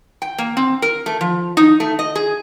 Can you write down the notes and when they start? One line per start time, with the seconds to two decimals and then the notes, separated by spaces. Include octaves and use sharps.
0.22 G5
0.38 A#3
0.57 C4
0.82 A#4
1.06 A3
1.21 F3
1.57 D#4
1.80 A3
1.99 D#5
2.15 G#4